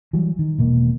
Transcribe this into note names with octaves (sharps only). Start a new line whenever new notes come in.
E3 F#3 G3
D#3
E1 B2 A#3